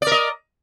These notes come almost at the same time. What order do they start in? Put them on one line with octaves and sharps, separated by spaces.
D5 A#4 D#5